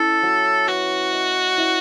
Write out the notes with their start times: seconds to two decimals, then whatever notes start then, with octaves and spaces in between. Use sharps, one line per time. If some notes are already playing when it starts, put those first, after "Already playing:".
Already playing: C#4 E4 A4
0.23 F#3
0.68 F#4 B4
1.12 D#5
1.57 E4